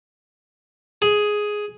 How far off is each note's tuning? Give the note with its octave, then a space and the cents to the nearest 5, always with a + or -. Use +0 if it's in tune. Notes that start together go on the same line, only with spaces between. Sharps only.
G#4 +5